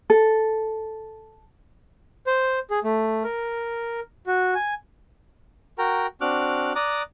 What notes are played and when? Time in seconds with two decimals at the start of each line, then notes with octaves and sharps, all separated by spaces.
0.10 A4
2.27 C5
2.71 G#4
2.84 A3
3.24 A#4
4.27 F#4
4.55 G#5
5.78 F#4 A#4 G5 A#5
6.21 C4 D4 F#4 D6 F6 F#6
6.75 D5 A#5 D6 D#6 F#6